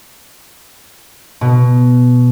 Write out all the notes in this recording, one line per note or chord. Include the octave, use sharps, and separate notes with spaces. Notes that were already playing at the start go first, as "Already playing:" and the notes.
B2